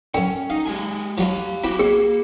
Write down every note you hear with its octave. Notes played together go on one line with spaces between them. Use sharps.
F#2 D3 C#4 G5
D#4 F5
G#3 G4 G#5
F3 F#3 D#4 G4 F5
C4 E4 F#4 G4 B5
A#3 C4 G#4